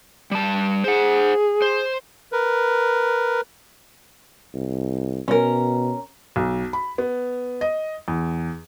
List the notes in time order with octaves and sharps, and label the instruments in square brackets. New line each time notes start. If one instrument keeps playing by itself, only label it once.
[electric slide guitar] G3 A5
[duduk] G#4 [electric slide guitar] C5 F#5
[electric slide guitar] C5
[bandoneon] A#4 B4
[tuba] C2
[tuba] B2 [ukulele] C#4 A#4
[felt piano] B1
B5
B3
D#5
E2